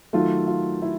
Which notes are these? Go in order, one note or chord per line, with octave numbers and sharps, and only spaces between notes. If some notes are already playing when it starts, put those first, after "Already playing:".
D#3 F#3 A3 F4
F4
E4